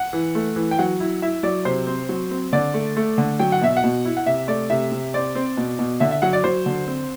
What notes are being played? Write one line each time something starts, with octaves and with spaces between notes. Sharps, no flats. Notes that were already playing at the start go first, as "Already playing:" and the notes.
Already playing: F#5
E3
A3
E3
G5
F#3 F#5
E4
E4 E5
F#3 D5
C3 C5
C4
F#3
C4
D3 D5
A3
A3
D3
F#3 G5
F#5
B2 E5
F#5
B2
E4
F#5
C3 E5
A3 D5
C3 E5
C3
C4 D5
C4
B2
B2
D3 E5
E5
F#3 F#5
D5
F#3 C5
D3
C4